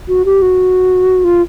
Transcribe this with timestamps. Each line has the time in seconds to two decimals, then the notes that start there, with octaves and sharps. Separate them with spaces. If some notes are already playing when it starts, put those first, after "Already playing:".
0.08 F#4
0.25 G4
0.42 F#4
1.24 F4